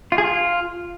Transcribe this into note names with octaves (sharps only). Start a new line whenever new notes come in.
F4
G#4
F4